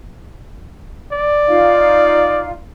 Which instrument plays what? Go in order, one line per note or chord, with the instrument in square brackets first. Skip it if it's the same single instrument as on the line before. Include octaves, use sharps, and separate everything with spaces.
[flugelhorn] D5
[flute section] D#4 F4 F5